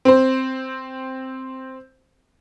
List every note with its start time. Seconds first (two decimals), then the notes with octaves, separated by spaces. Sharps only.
0.05 C4 C5